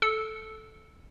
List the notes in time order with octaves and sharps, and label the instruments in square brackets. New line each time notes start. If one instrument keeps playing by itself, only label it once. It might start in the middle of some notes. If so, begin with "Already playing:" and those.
[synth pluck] A4 E6 C#7